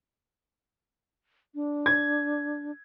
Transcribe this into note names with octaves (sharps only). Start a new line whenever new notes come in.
D4
G#6